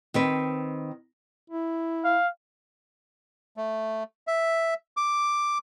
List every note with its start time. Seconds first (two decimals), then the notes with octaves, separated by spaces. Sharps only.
0.14 D#3 C4 B4
1.50 E4
2.04 F5
3.57 A3
4.27 E5
4.97 D6